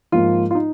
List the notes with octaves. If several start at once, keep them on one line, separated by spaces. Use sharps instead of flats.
G#2 F3 A#3 F4
F4
D#4